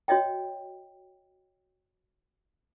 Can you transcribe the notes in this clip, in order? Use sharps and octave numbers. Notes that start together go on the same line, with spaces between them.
F#4 C#5 D#5 E5 G5